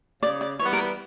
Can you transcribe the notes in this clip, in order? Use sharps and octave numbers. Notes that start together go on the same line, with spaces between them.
C#3 D5
D5
E3 G3 B3 C#5
A#4
B4